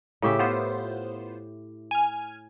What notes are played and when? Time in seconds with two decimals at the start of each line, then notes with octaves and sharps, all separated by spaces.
0.22 A2 C#3 G4 E5
0.39 B3 F4 C5
1.91 G#5 F6